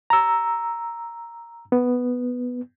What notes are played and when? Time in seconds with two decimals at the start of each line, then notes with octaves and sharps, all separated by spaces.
0.10 A#5 E6
1.72 B3